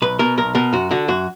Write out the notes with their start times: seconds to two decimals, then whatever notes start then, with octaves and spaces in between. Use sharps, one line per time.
0.02 B1 B4
0.19 B2 A#4
0.38 B1 A#4
0.55 B2 A#4
0.73 F#2 F#4
0.91 D3 F#4
1.08 F#2 F#4